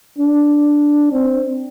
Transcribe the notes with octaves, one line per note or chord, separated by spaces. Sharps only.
D4
C4